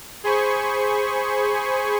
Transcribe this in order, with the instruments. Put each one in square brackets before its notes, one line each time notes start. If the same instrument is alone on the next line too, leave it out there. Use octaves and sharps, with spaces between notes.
[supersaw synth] G#4 C5 G#5 B5 C#6